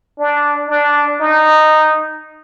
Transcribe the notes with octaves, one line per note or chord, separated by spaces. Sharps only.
D4
D4
D#4